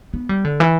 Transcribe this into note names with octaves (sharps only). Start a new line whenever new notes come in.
B3
G3
D3
E3